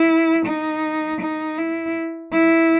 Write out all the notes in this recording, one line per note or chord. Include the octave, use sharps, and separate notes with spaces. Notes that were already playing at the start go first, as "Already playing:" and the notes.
Already playing: E4
D#4
D#4
E4
E4